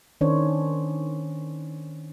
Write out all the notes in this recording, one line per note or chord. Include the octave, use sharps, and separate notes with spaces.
D#3 C#4 D4 C5 C#5